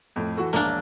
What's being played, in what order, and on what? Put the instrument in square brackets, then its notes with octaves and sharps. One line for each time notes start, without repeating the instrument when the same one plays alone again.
[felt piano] F2 A2
E3 F#4 A4
[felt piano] E1 A#1 [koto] A#3 D4